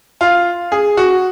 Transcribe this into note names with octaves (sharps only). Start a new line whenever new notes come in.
F4
G#4
F#4